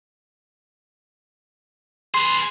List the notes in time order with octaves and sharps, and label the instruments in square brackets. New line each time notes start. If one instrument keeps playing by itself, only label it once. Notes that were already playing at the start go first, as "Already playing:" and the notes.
[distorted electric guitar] G#4 B4 [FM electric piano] C6